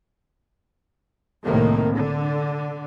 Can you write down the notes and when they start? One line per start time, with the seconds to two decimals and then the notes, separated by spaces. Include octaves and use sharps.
1.44 C2 A2 C3 D#3 A#3
1.93 D3